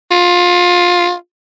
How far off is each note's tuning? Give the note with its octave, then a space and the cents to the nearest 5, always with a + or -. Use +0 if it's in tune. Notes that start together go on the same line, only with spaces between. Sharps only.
F4 +20